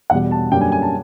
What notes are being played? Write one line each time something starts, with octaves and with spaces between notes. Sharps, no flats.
E2 B2 G3 F#5
A5
F#2 D3 G3 A#3 G5
G#5
G#5
A5